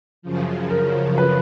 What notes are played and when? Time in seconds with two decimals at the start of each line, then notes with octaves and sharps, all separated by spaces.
0.22 F#2 C#3 F3
0.71 A#4
1.18 B4